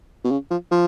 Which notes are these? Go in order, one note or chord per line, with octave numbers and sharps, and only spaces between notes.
B2
C#3
F3
F3